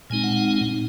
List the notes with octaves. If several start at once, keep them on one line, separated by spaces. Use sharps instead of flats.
A#2 G#3 C4 D#4 G#5
F#5
F#5